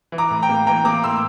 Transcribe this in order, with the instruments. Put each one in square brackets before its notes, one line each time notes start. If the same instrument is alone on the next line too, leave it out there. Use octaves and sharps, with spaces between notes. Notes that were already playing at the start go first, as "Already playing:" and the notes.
[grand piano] E3
A#5 D6
A2
G5 A#5
A#3
E3 G5 A#5
A#3 A#5 D6
A2 C6 E6